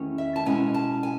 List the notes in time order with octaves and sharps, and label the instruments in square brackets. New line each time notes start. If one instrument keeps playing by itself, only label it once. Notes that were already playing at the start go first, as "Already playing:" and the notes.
Already playing: [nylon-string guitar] E2 D#3 A3 C#4 E4
E5
A5
B2 G#3 C#4 E4 G#5
A5
G#5